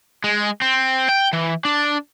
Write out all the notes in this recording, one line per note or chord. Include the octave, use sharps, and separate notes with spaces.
G#3
C4
G5
E3
D4